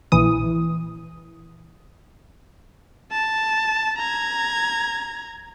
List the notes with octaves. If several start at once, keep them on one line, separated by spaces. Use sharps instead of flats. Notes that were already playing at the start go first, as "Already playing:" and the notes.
A#1 E3 D#6
A5
A#5 G#6